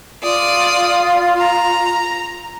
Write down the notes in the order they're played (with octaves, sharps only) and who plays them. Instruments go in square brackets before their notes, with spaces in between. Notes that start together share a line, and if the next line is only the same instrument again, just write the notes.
[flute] F4 [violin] D5 D#6
[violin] A#5